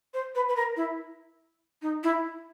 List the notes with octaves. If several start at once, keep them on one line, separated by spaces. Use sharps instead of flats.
C5
B4
B4
A#4
E4
D#4
E4